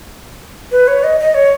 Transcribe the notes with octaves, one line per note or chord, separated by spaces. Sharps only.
B4
C#5
D#5
D#5
C#5